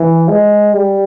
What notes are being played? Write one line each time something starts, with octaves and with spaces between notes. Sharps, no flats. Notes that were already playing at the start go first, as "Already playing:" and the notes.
Already playing: E3
G#3
G3